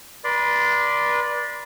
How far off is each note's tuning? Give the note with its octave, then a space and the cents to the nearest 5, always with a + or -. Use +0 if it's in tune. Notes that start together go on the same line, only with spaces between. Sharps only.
B4 -40 D5 +0 C6 -25